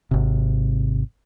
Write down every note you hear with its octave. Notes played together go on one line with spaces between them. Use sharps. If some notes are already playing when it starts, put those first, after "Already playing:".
G#1 C3